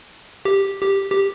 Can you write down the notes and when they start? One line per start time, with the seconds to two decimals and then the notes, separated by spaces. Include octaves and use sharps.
0.45 G4
0.83 G4
1.11 G4